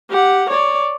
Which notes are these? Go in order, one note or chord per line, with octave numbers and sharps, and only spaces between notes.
G4 F#5
C#5 D5